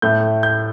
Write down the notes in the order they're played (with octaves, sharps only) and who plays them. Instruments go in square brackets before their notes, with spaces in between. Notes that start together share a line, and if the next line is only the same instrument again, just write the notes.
[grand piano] A2 A3 G6
G6